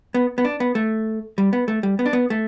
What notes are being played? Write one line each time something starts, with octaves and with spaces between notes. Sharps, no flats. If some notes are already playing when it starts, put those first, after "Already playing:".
B3
B3
D4
B3
A3
G3
B3
A3
G3
B3
D4
B3
A3